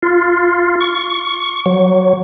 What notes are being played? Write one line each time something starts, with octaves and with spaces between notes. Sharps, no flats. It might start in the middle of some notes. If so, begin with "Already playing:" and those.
F4
C#6
F#3